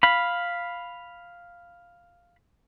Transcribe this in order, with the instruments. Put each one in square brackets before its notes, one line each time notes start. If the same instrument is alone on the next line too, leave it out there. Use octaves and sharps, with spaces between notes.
[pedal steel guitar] F5 B5